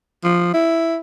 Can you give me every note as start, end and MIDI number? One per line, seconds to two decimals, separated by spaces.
0.24 0.51 53
0.54 0.98 64